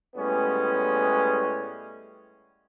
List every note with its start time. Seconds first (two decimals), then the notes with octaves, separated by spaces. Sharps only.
0.16 A2 G3 G#3 B3 C#4